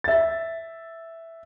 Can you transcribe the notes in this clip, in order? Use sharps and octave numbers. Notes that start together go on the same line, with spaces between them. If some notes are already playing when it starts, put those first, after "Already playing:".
E5 A6